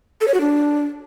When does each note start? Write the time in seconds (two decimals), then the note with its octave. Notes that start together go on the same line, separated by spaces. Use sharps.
0.21 A4
0.28 C#5
0.34 F#4
0.41 D4